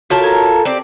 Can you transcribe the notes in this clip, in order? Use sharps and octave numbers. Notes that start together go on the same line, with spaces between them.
F4 F#4 A4 A#4 C#5
A#5 G#6
C4 G4 D5